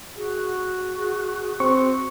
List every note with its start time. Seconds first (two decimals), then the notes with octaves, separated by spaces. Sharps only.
0.16 F#4 G#4
0.97 G#4
1.60 C4 C#6